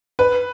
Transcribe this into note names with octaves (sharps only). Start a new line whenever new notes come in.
B4